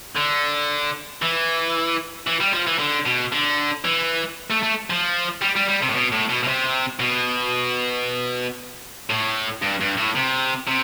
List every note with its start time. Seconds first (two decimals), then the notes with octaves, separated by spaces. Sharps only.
0.16 D3
1.22 E3
2.27 E3
2.40 G3
2.53 F3
2.67 E3
2.79 D3
3.06 B2
3.33 D3
3.85 E3
4.50 A3
4.63 A3
4.90 F3
5.42 G3
5.56 G3
5.69 G3
5.82 C3
5.89 A2
5.95 B2
6.12 A2
6.29 B2
6.43 B2
6.48 C3
6.99 B2
9.10 A2
9.62 G2
9.81 G2
9.97 A2
10.15 C3
10.67 C3